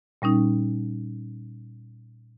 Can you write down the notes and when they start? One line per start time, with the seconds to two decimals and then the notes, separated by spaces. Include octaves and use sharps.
0.22 A#2 G3 C#4 D#4